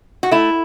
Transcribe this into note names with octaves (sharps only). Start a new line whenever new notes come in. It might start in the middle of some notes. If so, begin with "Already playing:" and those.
F#4
A3 E4